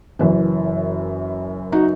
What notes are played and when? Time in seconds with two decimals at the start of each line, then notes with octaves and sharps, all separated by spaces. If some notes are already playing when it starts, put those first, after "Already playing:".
0.19 F#1 F#2 E3
1.72 D#4 F#4